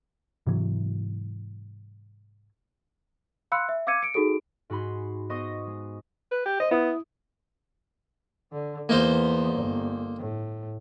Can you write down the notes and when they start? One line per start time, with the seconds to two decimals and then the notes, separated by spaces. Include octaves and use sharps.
0.47 G#2 C3 E3 F#3
3.52 F5 B5 C6 E6 F#6 C#7
3.69 E5
3.87 F5 D6 E6 G#6 C#7 D#7
4.02 C#7 D7
4.14 D#4 F#4 G#4 A4 D7
4.70 G#2 F#4 G#4 B5 C6
5.29 B3 C5 D#5 C#6 D#6 A#6
5.67 G#3
6.31 B4
6.46 G4
6.60 C5 D#5
6.71 B3 E4 D#6
8.52 D3
8.89 E2 A#3 B3 D#4 C5
9.55 G1
10.18 A2